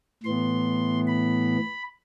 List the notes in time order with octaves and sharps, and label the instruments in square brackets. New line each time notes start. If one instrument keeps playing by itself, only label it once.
[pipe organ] A2 E3 B3 C6
B5